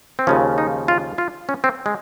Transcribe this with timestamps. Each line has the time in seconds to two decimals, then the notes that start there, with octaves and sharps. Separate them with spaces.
0.19 C4
0.27 D#2 C#3 F3 C#4
0.58 D#4
0.88 F4
1.18 F4
1.49 C#4
1.64 C4
1.86 G#3